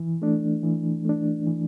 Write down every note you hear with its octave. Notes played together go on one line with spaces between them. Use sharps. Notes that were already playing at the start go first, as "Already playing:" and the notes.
Already playing: E3
A3 D4
E3
A3 D4
E3